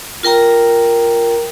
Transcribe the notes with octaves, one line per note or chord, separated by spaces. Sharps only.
F4 A#4 G5 A#5